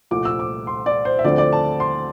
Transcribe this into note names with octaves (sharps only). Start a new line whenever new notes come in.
C2 A#2 F3 A3 D6
E6
D6
C6
D5
C5
E5
D2 D3 F3 A3 C4 D5
D5
A5
C6